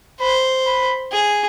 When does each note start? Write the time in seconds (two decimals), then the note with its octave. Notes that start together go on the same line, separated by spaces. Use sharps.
0.20 C5 B5
0.67 B5
1.12 G#4